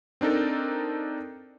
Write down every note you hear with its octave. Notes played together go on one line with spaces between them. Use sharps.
C4 D4 D#4 A4 A#4